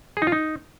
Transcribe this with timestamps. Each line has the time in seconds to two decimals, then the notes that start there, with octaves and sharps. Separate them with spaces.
0.17 G#4
0.22 D#4
0.27 F4
0.32 D#4